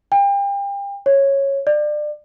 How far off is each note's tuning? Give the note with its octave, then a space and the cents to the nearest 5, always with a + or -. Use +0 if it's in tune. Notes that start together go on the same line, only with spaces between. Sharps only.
G5 +35
C#5 -10
D5 +25